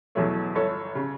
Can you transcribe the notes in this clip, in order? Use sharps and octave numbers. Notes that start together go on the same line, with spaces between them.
E2 B2 F#3 A3 C#5 E5
G1 A4 C#5
C#3